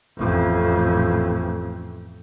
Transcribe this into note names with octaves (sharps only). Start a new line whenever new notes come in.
A1 F2